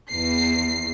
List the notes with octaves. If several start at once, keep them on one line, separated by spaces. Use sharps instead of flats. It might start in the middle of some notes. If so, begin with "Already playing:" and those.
E2 C7